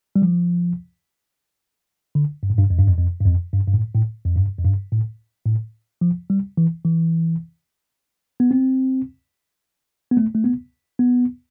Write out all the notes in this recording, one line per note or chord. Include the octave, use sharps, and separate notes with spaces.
G3
F3
D3
G2
A2
G2
F2
G2
F2
F2
G2
F2
G2
G2
A2
A2
F2
G2
F2
G2
A2
A2
F3
G3
E3
E3
B3
C4
B3
A3
A3
B3
B3